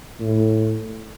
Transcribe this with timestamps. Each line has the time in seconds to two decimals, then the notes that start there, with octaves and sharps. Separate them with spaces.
0.20 A2